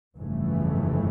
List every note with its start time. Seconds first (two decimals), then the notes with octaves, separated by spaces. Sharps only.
0.17 G1 F2 C#3 E3 A3